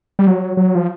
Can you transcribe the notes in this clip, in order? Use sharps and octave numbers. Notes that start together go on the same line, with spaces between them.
G3
F#3
F#3
F3